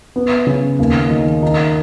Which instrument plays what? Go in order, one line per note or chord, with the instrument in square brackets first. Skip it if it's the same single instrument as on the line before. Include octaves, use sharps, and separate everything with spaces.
[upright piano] B3
C#3
D#2
D#3
D#4